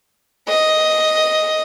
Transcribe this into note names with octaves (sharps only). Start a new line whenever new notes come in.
D#5